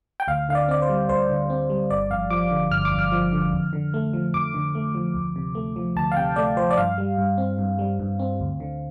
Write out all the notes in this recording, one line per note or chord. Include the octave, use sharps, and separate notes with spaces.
G5
D2 F5
D3 F5
D5
C4 D5
C5
G3
D2 C5
D3
C4
G3
G1 D5
F2 F5
F3 D6
D3
G1 F6
D6
F2
F6
F3
D3
F2
D3
A3
F3
F2 D6
D3
A3
F3
D2
C3
A3
F3
D2 A5
F5
C3 G5
A3 D5
F3 C5
D5
G2 F5
G3
G2
C4
G2
G3
G2
C4
D2
D3